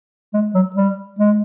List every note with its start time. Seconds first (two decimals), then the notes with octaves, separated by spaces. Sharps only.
0.34 G#3
0.54 F#3
0.76 G3
1.19 G#3